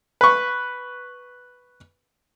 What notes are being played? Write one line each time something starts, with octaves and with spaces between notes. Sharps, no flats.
B4 C#6